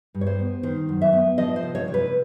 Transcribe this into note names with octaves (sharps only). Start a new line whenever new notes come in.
G2
C#5
C5
B3
D#3 C5
F#2
E5
B3
F3 D#5
C5
C3
C#5
C3
B4